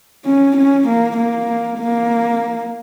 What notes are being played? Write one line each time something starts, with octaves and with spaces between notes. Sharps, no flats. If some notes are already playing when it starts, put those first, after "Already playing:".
C#4
C#4
A#3
A#3
A#3